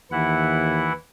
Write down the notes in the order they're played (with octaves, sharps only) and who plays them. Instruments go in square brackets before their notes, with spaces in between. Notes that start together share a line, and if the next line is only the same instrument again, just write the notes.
[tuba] D#2 [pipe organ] E3 E4 F#5